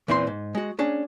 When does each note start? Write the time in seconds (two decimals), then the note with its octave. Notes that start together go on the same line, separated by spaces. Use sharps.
0.08 E2 A#2 E3 C4 F#4 C6
0.27 G#2
0.55 G#3 F#4
0.79 A#3 C#4 D4 G#4